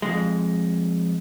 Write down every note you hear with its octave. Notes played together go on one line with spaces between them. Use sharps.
F2 G#3